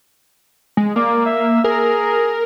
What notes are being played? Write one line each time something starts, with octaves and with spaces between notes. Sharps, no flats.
G#3
A#3 D5
E5
G#4 A#4